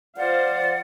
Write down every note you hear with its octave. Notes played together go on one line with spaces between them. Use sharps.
F3 C5 D5 F5 F#5